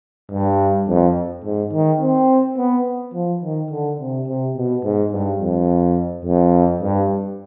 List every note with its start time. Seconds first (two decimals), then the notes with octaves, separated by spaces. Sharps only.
0.32 G2
0.88 F2
1.44 G#2
1.73 D#3
2.01 C4
2.58 B3
3.14 F3
3.43 D#3
3.71 D3
3.99 C3
4.27 C3
4.56 B2
4.84 G#2
5.12 G2
5.40 F2
6.25 F2
6.82 G2